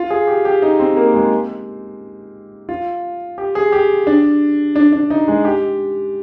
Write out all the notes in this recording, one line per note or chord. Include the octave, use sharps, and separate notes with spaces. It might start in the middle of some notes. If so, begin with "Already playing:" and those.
Already playing: F4
G#4
G4
G4
D#4
C4
A#3
G#3
F4
G4
G#4
G4
D4
D4
D4
D#4
G#3
G4